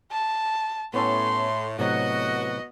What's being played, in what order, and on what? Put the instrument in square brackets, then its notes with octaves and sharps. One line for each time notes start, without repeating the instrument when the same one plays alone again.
[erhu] A5
[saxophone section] A2 [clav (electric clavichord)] B3 C#4 A4 [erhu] C6
[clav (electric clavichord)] A2 C3 F#3 [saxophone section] B3 F#4 [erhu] D#5